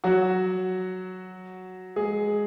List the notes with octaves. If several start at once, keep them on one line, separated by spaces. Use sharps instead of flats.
F#3 F#4
G#3 G#4